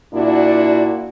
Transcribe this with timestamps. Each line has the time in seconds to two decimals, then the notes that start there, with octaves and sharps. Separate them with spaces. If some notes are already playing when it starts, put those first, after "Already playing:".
0.13 A#2 D4 E4 F#4